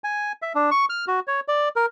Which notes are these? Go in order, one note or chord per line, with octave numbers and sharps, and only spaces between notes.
G#5
E5
D4
C#6
F6
F#4
C#5
D5
A#4